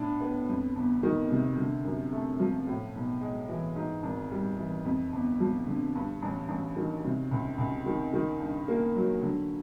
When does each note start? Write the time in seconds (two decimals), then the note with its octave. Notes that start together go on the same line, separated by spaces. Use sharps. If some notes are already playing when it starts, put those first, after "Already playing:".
Already playing: A2 D4
0.21 B3
0.49 F2
0.76 G1
1.03 D#3
1.31 C3
1.58 D3
1.85 F#2
2.13 A3
2.40 F3
2.67 A2
2.94 B1
3.21 G#3
3.49 E3
3.76 G#2
4.03 G#1
4.31 G3
4.58 E3
4.85 F2
5.13 G1
5.40 F3
5.67 D3
5.95 G2
6.22 A1
6.49 A1
6.76 D#3
7.04 C3
7.31 C#2
7.58 C#2
7.86 D#3
8.13 D#3
8.40 G2
8.68 A#3
8.95 F#3
9.22 D3